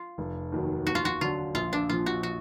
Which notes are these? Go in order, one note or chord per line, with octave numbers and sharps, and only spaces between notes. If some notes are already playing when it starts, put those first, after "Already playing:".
Already playing: F4
F1
D#2 D#3 F#3
D#2 F#4
F4
F#4
D3 F#3 D4 F4
A#1 F4
D4
A#2 F3 F4
F#4
F#4